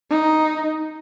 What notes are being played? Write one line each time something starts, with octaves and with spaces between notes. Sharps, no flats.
D#4